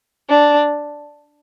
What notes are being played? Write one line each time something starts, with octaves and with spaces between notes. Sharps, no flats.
D4